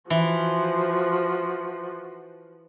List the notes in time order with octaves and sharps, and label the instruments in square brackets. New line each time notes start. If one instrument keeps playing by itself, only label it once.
[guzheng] E3 [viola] F3 F#4